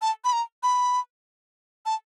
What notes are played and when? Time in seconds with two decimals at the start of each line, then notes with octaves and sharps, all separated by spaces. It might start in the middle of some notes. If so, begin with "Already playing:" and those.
0.02 A5
0.25 B5
0.33 A#5
0.63 B5
1.86 A5